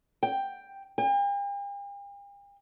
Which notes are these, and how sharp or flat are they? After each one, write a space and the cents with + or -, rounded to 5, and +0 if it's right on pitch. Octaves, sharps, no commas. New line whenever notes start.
G5 +5
G5 +45